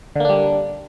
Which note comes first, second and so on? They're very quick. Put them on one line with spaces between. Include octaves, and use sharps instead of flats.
D3 A#3 D4 G3